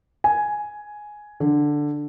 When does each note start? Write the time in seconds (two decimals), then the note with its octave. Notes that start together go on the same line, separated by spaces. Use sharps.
0.24 G#5
1.40 D3